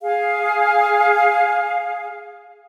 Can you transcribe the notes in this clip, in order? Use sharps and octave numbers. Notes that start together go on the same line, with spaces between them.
G#4 F5